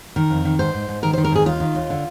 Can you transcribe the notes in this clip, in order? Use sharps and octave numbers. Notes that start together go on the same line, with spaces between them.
D#3 A#4
F2
D#3
G#2 C5
G#2
G#2
D#3 A#4
D#3 C5
A#4
G#2 G#4
D#2 F4
D#3
D#2
D3